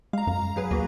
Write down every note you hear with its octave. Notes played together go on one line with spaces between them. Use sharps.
G#3 F5 A#5
F#2
F#3 G#4 B4
D#2 A#3 F#4